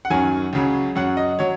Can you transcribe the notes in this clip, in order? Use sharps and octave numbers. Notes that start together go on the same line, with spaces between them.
F#5
F#2 D#3 F#3 G#5
C#2 C#3 F#3
F#2 F#3 F#5
D#5
F#3 C#5